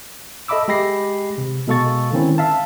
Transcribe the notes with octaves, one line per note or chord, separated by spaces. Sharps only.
A4 D#5 E5 B5 D6 E6
G#3 G4 B5 A#6 C7
C3
B2 G#3 A4 F5 C#6 A6
D3 D#3 G#3 C4 C#4 E4
E5 F5 A5